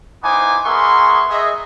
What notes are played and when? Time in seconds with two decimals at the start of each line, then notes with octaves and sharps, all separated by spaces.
0.23 B3 D#4 E4 C5 G#5 D6
0.64 B3 G#4 A#4 E5 C6 C#6
1.30 G#4 D#5 E5